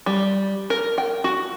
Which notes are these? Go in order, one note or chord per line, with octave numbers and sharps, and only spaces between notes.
G3
A#4
G5
F#4